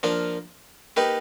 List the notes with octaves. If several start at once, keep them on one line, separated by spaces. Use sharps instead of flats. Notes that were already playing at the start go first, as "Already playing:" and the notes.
F3 A#3 D4
A#3 D#4 G4 B4